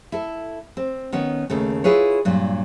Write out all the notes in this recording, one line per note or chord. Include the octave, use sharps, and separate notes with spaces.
E4 A4
C4
D#3 B3 C#4
D#2 C#3 A3
E4 F4 G#4 B4 C#5
G2 A#2 F#3